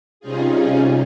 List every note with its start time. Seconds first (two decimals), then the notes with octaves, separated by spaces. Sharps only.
0.20 C3 G3 C#4 D#4 F4 G#4